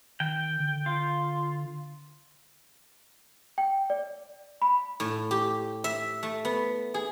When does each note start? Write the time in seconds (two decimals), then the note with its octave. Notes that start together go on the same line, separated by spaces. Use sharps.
0.20 D#3 G5
0.60 D3
0.86 F4
3.58 G5
3.90 D5
4.62 B5
5.00 A2
5.31 G4
5.84 E5
6.23 A3
6.45 B3
6.94 G#4